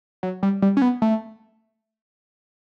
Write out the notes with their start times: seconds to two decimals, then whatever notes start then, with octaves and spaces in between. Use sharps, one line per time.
0.23 F#3
0.43 G3
0.62 G3
0.77 C#4
0.82 B3
1.02 A3